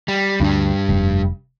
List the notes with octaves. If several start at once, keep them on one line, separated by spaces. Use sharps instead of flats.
G3
D2 G2 G3 D4
F1